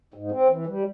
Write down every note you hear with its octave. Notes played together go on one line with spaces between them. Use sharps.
G#2
C4
E3
G3